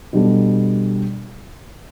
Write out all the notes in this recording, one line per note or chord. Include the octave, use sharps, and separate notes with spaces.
B2 G3 D4 A4